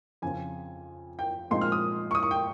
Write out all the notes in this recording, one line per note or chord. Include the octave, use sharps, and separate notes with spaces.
F2 C#3 F3 C4 G#5
G5
A#2 F3 G#3 C4 D#4 C6
F6
D#6
C#6
D#6
C#6
G5